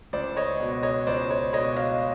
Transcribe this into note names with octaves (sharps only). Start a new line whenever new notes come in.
C#2 C5 D5
C#5 D#5
B2
C#5 D#5
C#2 C5 D5
C#5
B2 C#5 D#5
D#5 F5